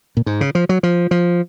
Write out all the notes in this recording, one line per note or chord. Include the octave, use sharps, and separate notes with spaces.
A#2
G#2
C#3
F3
F#3
F3
F3